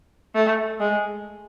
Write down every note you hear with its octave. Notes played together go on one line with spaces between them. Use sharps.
A3
G#3